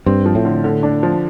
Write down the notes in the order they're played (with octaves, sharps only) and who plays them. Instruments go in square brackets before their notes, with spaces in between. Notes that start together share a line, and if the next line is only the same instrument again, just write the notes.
[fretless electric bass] G2 [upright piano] C4
[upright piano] F3
[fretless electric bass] A2
[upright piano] D3
D3
D4
F3